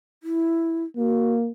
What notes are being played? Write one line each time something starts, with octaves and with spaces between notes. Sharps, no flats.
E4
A#3 F#4